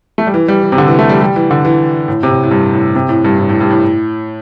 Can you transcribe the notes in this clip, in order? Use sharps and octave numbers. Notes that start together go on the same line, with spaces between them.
A3
G3
E3
G3
E3
C3
D3
E3
A3
G3
G3
E3
D3
E3
A2
C3
A2
A2
G2
A2
C3
A2
G2
A2
A2
G2
A2